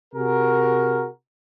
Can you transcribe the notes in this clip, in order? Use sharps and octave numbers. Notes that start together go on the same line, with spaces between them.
C3 F#4 G#4 A#4